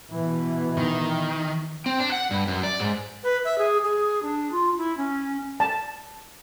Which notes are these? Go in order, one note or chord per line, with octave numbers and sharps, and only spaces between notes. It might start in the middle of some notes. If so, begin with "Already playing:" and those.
B2 E3
D#3
C4
D4
F#5
G2
F#2
D5
G#2
B4
E5
G#4
G#4
D4
F4
E4
C#4
A5